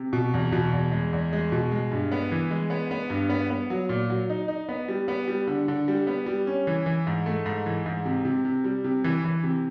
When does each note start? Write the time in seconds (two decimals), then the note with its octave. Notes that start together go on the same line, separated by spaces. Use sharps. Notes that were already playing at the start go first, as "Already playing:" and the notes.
Already playing: C3
0.13 B2
0.34 E2
0.52 B2
0.73 E2
0.92 G#3
1.13 E2
1.33 G#3
1.52 B2
1.72 G#3
1.91 G2
2.12 B3
2.32 E3
2.51 G#3
2.70 B3
2.91 B3
3.10 G2
3.30 B3
3.50 B3
3.70 F#3
3.89 A#2
4.10 F#3
4.30 D#4
4.48 D#4
4.69 B3
4.88 G3
5.08 B3
5.28 G3
5.47 D3
5.68 D3
5.88 G3
6.07 B3
6.26 G3
6.47 C#4
6.67 E3
6.86 E3
7.07 G#2
7.26 A3
7.46 G#2
7.66 E3
7.86 G#2
8.05 C3
8.25 C3
8.45 C3
8.64 G3
8.84 C3
9.04 E3
9.24 E3
9.43 C3